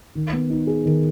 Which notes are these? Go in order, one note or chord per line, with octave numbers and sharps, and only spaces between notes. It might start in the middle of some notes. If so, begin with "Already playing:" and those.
D#3
B3
D#4
G#4
D#3